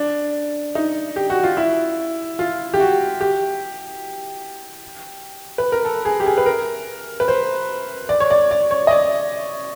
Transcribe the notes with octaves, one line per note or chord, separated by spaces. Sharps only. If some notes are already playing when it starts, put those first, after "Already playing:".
Already playing: D4
D#4
G4
F#4
F4
E4
F4
G4
F#4
G4
B4
A#4
A4
G#4
G4
G#4
B4
A#4
B4
C5
D5
C#5
D5
D5
C#5
D#5
D5